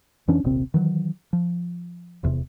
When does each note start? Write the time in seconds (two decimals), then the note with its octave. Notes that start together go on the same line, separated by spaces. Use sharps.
0.28 F2 E3 C#4 D4
0.44 D#1 A#1 C3 C4
0.74 D#3 E3 F#3
1.33 F3
2.23 D#1 E2 C3